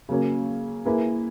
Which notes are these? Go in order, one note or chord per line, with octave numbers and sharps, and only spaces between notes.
C#3 F#3 A#3 C#4
A#3 E4 G#4 B4